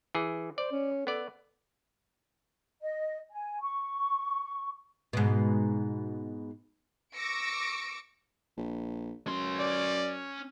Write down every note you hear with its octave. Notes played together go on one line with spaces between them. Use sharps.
E3 G#4
C5 D5
C#4
B3 A4 D5
D#5
G#5
C#6
G#2 B2
C#6 D6 E6 A#6 C#7 D7
A#1
F#2 C#4 C6
D5